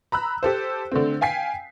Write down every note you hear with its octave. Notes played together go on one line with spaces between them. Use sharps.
A#5 B5 E6 F#6
G4 A4 C5
D3 A3 C4
F5 G5 G#5 B6 C7